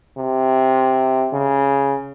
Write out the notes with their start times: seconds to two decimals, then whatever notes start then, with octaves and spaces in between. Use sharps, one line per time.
0.18 C3
1.33 C#3